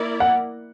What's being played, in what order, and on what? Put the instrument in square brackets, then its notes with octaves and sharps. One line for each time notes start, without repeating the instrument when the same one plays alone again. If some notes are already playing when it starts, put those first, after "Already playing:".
Already playing: [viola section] A#3 E4 A#4 D5
[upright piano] F#5